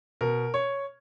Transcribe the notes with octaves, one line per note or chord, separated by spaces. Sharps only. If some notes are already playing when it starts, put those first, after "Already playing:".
B2 A#4
C#5